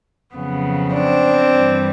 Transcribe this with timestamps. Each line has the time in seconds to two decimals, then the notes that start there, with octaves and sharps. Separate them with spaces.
0.35 F2 C#3 F#3 B3
0.93 C4 D4
1.51 G2 E3 G3